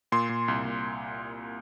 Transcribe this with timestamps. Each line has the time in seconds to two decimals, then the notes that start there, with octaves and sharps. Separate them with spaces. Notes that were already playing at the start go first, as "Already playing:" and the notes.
0.12 A#2 C6
0.29 A#2
0.48 C2
0.65 A#2